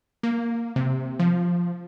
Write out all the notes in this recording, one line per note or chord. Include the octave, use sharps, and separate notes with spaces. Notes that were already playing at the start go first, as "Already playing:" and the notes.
A#3
C3
F3